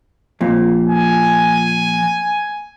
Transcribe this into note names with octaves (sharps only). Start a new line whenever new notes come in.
F2 A#2
G#5